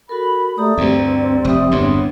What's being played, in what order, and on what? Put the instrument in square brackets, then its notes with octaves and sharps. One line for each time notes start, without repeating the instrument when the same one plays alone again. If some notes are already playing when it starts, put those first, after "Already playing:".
[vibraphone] F#4 A4 A#4 [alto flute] B5
[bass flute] A3 [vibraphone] G4 A#5 D#6 [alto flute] D5
[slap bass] D2 G2 [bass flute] C4 [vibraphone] A#5
[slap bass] F1 [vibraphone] G4 E5 D#6
[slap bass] G1 E2 A2 [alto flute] B3 [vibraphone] D4 C#5 C6